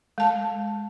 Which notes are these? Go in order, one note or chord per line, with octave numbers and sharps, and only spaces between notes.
G#3 A5